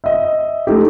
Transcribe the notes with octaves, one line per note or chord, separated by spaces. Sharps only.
D#5 E5
A3 D#4 G4